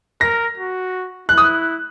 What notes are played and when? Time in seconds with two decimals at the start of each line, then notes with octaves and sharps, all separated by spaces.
0.21 A#4 A#6
0.58 F#4
1.29 E4 F#6
1.38 D#6